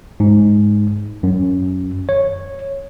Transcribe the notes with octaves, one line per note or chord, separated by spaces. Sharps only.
G#2
F#2
C#5